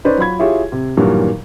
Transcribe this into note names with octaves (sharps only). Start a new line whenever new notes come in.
C#4 D#4 B4 C5 D5
F#3 F4 B5 G#6
E4 F4 G4 G#4 C#5 E5
C3
G2 A#2 D#3 E3 F#3 G3